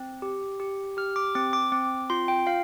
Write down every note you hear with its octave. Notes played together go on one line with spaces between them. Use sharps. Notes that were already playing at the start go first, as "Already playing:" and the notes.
Already playing: C4
G4
G4
G4 F6
D6
C4 D6
D6
C4 D6
F4 C6
G5
F4 F5